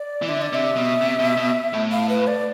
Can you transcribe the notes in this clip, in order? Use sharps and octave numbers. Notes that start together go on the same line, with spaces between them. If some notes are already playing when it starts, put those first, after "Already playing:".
Already playing: D5
E3
D3 E5
D5
C3 E5
B2
C3
B2
B2
A2
F5
B4
D5